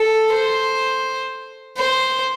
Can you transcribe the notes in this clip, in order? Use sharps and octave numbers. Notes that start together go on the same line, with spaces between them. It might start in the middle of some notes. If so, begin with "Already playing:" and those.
Already playing: A4
C5
C5